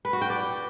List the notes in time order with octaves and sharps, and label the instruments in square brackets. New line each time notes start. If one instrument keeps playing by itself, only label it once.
[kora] B4
F#4
G5
D5